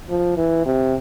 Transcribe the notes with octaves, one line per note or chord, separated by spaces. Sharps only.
F3
E3
C3